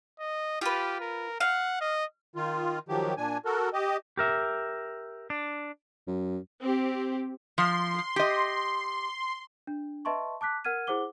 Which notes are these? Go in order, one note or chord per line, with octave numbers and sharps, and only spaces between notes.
D#5
F4 G4 B4
A#4
F5 F#5
D#5
D#3 F4
D#3 F3 F#3 G4
A#2 D4 G#5
F#4 A4 A#4
G4 D#5
G4 A#4 E5
D4
F#2
C4 G4
F3 C6
G4 D#5
D4
B4 D#5 E5 A5 C6 C#6
A5 D6 F#6 B6
A#4 F#5 F6 G#6 D#7
E4 G#4 C5 F#5 D6 G7